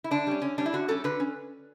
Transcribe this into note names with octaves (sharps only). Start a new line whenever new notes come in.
E4
D3 D4
G3 C#4
D3 C#4
G3 C#4 D4
E4
D3 F#4
G3 C#4 A4
D3 B4
C#4